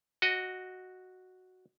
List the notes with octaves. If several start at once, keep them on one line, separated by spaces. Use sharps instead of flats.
F#4 D#5